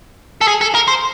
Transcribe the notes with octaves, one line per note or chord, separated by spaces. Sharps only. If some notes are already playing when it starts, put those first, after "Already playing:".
A4
G#4
A4
A#4
C5